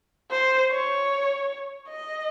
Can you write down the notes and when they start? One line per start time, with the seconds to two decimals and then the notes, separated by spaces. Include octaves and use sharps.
0.31 C5
0.71 C#5
1.89 D#5